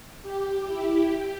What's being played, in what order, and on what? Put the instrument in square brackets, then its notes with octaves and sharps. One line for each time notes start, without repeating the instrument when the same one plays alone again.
[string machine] G4
E4
G4